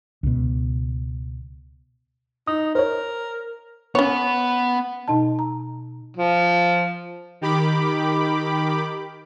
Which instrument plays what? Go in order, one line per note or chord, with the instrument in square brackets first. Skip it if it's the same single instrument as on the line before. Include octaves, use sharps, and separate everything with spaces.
[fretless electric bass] C#2 B2
[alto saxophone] D#4 [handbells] D#6
[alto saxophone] A#4 [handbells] C5 C#5
[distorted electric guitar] B3 [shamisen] C#4 C#5
[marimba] B2 D#4 D#5 A5
A#5
[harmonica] F3
[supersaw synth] D#3 G4 B5 D6